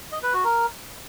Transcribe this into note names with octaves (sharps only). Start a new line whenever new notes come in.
D#5
B4
F#4
A#4